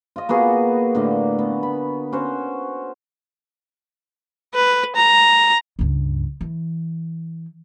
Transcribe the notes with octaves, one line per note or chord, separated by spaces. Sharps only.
F4 D#5
A#3 B3 F#4 G#4
A2 D3 A#3
B3
B5
C#4 F#4 C5
B4
A#5
C#2 G2
E3